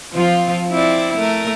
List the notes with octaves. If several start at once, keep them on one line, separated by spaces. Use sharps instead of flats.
F3 C4 F4
C4 E4 D5
A3 A#4